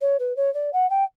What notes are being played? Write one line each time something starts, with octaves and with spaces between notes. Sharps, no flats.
C#5
B4
C#5
D5
F#5
G5